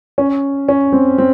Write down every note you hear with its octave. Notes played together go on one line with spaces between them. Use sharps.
C#4
C#4
C4
C4